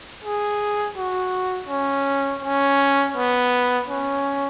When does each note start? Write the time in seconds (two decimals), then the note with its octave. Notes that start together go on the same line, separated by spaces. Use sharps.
0.23 G#4
0.96 F#4
1.69 C#4
2.43 C#4
3.16 B3
3.89 C#4